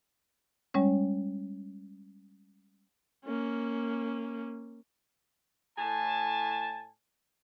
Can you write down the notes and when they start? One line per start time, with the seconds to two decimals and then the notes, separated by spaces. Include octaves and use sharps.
0.74 G3 G#3 C#4 C#5
3.25 A#3 C#4
5.78 A2 G#5 A5